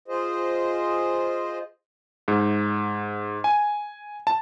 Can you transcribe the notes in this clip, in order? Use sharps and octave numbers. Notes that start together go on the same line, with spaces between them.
F4 G#4 C5 D#5
G#2
G#5
A5